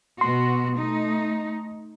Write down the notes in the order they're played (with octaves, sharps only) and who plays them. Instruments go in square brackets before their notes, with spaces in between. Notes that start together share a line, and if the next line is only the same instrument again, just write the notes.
[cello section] B2 B3 F#4 [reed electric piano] C6
[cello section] A3 D#4